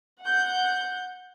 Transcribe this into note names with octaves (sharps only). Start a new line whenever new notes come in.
F#5 G6